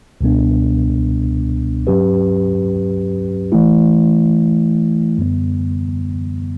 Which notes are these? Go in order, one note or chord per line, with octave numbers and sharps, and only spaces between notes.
C#2 B2 G3 B3 D4
G2 F#3 C#4 G4 B4
E3 A3 E4
F#2 D3 G3 B3